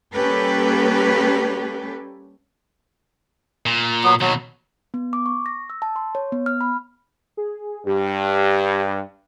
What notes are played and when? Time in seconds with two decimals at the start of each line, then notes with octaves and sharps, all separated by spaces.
0.14 G3 A#3 C#4 G4 A4 B4
3.66 A#2
4.04 F#3 B3
4.21 D#2 B2 F#3
4.94 B3
5.13 D6
5.26 C#6
5.46 A#6
5.70 E6
5.82 A5
5.96 C6
6.15 C#5
6.32 B3
6.46 F6
6.61 B5
7.37 G#4
7.86 G2 G4